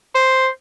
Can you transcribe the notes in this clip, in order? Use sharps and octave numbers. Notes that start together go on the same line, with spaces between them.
C5